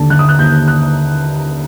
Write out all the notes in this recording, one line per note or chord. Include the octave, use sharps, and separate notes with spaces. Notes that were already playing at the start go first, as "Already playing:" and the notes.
Already playing: D#2 D3 A5
D3 F#6
D#6
F#6
D#2 G6
F#6